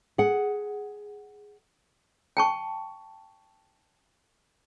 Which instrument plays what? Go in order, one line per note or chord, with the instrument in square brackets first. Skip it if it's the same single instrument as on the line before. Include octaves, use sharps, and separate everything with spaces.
[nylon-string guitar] G#4 F#5
[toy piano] G5 A5 C#6